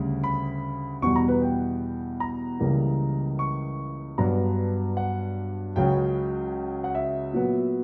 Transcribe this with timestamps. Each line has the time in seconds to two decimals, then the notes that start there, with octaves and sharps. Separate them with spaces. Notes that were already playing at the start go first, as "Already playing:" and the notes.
Already playing: D2 C#3 G3
0.24 B5
1.02 E2 B2 G3 C#6
1.16 A#5
1.28 B4
1.42 G5
2.20 A#5
2.59 C#2 C#3 E3 G3 A#3
3.39 C#6
4.18 G2 F#3 B3 D4 A#5
4.97 F#5
5.76 C#2 C#3 F#3 C#4 G5
6.84 F#5
6.95 E5
7.33 A#2 F#3 B3